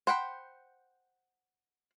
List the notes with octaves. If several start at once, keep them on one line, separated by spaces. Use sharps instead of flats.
C5 F#5 G5 B5